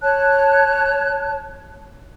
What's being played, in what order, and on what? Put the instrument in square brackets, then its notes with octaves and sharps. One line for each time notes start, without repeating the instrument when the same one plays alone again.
[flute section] C#5 A5 F#6